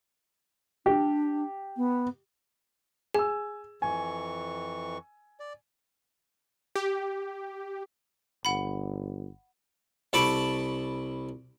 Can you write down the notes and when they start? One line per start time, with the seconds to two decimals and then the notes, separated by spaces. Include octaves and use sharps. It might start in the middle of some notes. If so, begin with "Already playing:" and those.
0.86 D4 G4
1.76 B3
3.14 G#4 G#5 E6
3.82 F2 E3 G#5 C#6
5.40 D5
6.75 G4
8.45 G1 F#5 B5
10.13 C2 A4 A5 B5 C#6 D6